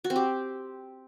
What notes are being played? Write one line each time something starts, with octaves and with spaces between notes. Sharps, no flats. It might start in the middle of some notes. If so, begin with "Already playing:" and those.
F#4
C4
G4